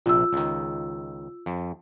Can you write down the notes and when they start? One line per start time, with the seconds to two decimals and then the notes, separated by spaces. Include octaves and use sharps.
0.06 A#1 C3 F4 E6
0.33 C#2 D#3
1.46 F2